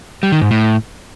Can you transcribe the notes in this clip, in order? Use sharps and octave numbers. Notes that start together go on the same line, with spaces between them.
G3
D#3
G#2
A2